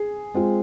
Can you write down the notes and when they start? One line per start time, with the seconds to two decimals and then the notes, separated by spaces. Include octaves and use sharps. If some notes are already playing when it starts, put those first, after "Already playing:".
Already playing: G#4
0.34 G#3 C4 F4